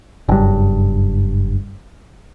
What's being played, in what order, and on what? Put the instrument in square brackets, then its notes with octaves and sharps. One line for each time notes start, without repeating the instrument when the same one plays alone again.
[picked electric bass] F#1 G2